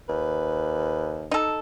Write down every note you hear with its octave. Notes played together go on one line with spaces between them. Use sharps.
D#2 B4
D#4 A4